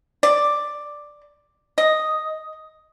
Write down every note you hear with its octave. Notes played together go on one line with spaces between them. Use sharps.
D5
D#5